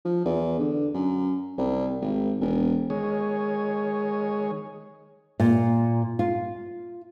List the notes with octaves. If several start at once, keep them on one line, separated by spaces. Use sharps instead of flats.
F3
E2
D3
F#2
C2
G#1
E1
D#3 G#3 G#4 C#5
A#2
F4